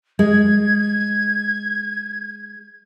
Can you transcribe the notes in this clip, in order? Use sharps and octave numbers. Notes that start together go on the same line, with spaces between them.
G#3 G#6